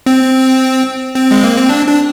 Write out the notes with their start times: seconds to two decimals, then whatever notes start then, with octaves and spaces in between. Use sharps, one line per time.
0.06 C4
1.15 C4
1.31 G#3
1.43 A#3
1.56 C4
1.69 D4
1.87 D4